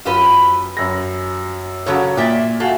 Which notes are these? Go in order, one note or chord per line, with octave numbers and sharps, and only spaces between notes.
F#2 F4 G4 B4
F#2 A#6
A#2 C#3 F#3 F#4 A4 C#5
A#2 D5 E5 G5
A3 F#4 F5 G#5